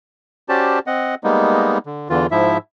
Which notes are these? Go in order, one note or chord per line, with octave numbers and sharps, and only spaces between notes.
C#4 F#4 G4 C5 D5 A5
C4 D#5 F#5
G3 G#3 A#3 B3 D#4
D3
E2 D3 E3 F4
G#2 F3 E4 E5